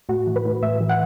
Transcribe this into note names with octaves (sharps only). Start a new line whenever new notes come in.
A2 F#4
E3
B4
A2
A2 E5
E3
F#5